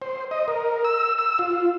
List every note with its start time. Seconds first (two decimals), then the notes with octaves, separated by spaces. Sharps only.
0.02 C5
0.31 D#5
0.48 A#4
0.85 E6
1.18 E6
1.39 F4